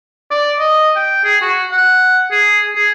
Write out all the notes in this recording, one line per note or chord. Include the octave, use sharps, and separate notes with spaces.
D5
D#5
G5
G#4
F#4
F#5
G#4
G#4